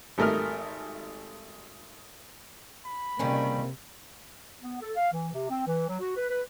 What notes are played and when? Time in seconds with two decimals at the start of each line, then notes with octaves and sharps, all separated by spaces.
0.18 G#1 G3 A3 A#4 D#6 F6
2.85 B5
3.19 C#2 C3 D#3 G3 A#3 C4 C#4
4.62 B3
4.81 A4
4.97 F5
5.13 E3
5.33 C3
5.50 C4
5.67 E3
5.88 F#3
6.00 F#4
6.16 B4
6.29 B4